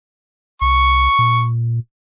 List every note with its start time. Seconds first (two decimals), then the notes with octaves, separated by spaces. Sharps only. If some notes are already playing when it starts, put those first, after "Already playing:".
0.62 C2 C#6
1.19 A#2